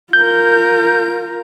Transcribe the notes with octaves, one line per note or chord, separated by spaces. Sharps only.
F4 A#4 G6